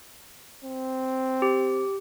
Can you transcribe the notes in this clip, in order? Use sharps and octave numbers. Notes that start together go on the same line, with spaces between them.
C4
G4